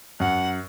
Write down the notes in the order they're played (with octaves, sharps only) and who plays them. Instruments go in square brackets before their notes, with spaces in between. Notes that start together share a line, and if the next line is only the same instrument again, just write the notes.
[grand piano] F#2 [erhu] F#5